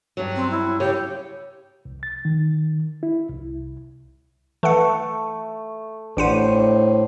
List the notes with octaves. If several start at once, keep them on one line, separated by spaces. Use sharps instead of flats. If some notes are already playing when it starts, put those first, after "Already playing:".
G2 F#3
C4
E4
C#3 G4 C#5
C2
A6
D#3
E4
C2
E3 A3 F#5
A1 A2 D4 G4 C5 F#5 D#7